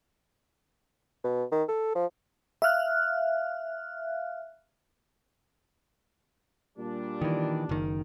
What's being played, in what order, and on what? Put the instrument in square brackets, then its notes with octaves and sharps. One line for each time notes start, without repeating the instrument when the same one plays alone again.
[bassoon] B2
D#3
A4
F3
[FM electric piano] E5 F5 F6 F#6
[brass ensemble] A#2 G3 D4
[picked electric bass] D#3 E3
F#1 D#3